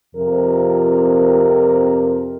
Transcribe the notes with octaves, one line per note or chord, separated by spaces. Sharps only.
F2 C3 F3 A#4